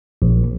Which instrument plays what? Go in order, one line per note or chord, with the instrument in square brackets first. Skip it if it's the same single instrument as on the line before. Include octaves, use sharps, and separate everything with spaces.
[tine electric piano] A#1